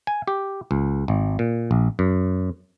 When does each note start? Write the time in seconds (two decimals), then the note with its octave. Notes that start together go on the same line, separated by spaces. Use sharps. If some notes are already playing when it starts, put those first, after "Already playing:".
0.07 G#5
0.28 G4
0.71 C#2
1.08 G#1
1.39 A#2
1.71 A#1
1.99 F#2